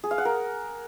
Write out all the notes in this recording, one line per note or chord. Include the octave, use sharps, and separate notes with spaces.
G#4
F5
F#5
A#4